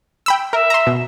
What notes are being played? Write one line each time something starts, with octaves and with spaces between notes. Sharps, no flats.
G5 B5 E6
A#4 E5
A#5 C6
B2